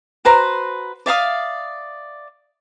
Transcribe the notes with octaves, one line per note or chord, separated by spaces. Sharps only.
F#4 B4 C5 A#5
D5 E5 F5 D#6